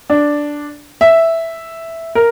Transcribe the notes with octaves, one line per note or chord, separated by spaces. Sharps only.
D4
E5
A#4